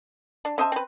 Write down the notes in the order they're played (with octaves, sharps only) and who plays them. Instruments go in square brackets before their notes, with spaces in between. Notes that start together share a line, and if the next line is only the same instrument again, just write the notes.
[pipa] D4
[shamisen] C#4 A5 [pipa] C5 D#5 E5
[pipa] C4 B4